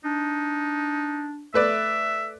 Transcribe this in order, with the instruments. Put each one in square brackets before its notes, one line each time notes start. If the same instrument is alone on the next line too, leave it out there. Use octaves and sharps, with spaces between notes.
[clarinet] D4 [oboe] D#4
[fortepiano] A3 B4 D5 [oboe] E5